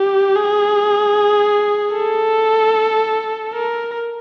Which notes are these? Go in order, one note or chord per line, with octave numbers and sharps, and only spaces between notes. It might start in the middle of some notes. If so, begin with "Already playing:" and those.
Already playing: G4
G#4
A4
A#4